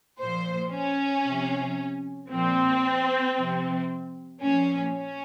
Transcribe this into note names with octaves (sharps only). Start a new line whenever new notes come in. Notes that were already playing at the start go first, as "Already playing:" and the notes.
A#2 F3 C5
C#4
C3 F3
A#2 F3 C4
C3 F3
A#2 F3 C#4
C#4